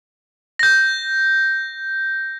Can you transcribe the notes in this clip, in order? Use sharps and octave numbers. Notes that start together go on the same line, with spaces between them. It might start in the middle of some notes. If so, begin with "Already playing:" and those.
G6 A#6